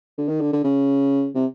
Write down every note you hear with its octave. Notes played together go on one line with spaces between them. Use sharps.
D3
D#3
D3
D3
C#3
C3